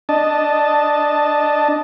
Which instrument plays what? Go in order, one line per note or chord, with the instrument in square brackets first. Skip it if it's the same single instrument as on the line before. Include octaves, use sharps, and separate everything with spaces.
[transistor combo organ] D4 D#5 A5